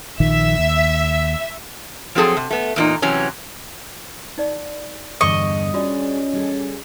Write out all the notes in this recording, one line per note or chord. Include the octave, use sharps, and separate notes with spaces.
A#1 D#3 F3 E5
D#2
F3 F#3 C4 G#4 A4
C3
A3 B3
E2 A#2 D#4
C3 E3 F#3 C#4
D#4 D5
E2 G2 D3 D#5 C#6
C#4 D4 F4 F#4 G#4 D5
G3 G#4 A4